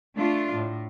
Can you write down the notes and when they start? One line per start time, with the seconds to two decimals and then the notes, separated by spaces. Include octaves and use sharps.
0.17 A3 D4 F4
0.54 A2